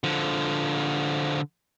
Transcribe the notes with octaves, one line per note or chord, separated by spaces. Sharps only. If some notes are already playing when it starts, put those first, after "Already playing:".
D3 F3